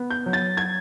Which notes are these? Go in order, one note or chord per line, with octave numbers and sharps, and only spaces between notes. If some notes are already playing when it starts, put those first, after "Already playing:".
Already playing: B3
G6
F#3
A6
G#6